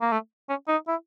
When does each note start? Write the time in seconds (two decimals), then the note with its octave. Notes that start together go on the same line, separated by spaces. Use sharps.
0.01 A#3
0.12 A3
0.49 C#4
0.68 D#4
0.88 E4